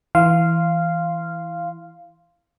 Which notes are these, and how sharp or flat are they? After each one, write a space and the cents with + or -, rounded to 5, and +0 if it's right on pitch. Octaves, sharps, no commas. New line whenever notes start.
E3 +0 F5 -10 C6 +0